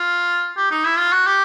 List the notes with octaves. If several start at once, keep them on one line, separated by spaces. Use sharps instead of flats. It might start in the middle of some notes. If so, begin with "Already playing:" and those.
Already playing: F4
G4
D#4
E4
F4
F#4
G4